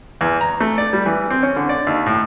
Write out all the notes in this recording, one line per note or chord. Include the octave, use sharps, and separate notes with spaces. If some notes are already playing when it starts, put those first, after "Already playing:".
E2
A#5
A3
D5
G3
E3
C4
C#4
D3
D5
D#2
A2